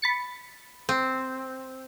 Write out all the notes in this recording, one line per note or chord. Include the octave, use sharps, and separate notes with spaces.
B5 A6 C#7
C4